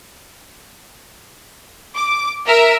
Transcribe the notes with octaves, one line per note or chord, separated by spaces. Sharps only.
D6
A#4 E5